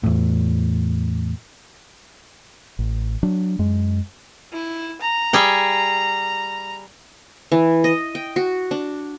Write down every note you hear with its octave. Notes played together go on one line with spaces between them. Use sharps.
E2 A2
A1
F#3 D4
F#2 G#3
E4
A#5
G3 G#4 G5
E3
D#5
G5
F#4
D4